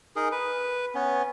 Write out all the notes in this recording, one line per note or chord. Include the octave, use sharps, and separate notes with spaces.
D#4 G#4 A#4
B4
B3 C#4